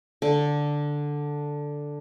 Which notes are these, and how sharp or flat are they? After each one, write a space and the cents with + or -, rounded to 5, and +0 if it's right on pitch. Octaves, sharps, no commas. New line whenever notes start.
D3 +0 A4 +0